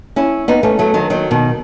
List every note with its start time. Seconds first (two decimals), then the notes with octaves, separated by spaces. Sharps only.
0.16 C#4 E4
0.48 B3 D#4
0.63 A3 C#4
0.79 F#3 A3
0.94 D#3 F#3
1.10 D#3 F#3
1.31 B2 D#3